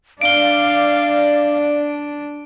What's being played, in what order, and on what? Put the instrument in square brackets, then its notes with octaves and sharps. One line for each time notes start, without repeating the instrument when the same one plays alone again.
[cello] D4 [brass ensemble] D5 [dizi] F5 [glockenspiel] D7 G7